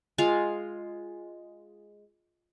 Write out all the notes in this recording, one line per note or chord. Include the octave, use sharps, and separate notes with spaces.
G#3 F4 F5